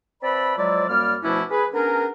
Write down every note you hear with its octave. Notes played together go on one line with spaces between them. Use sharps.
C4 B4 D5 E5 A5 B5
F3 F#3 G#3 E4 A4 D5
F#2 G3 A#3 D5 F6
B2 F3 A3 C#4 D4 E4
G#4 B4
B3 C#4 D4 G#4 A#4